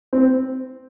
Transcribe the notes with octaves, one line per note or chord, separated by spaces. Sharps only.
C4